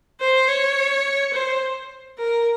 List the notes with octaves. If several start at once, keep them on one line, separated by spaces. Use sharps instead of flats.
C5
C#5
C5
A#4